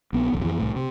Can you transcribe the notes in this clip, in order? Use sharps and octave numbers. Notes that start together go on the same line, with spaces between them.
A#1 B3
D1 B1 E2
F2 E3
C2 A2
C3